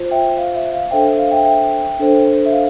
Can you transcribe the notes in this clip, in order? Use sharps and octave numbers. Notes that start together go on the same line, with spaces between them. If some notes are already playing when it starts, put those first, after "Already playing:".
Already playing: F4 C5
E5 G5
F5
E5
F5
D4 A4 C5 E5 G5
E5
F5
E5 G5
E5 G5
D4 A4 C5
E5
F5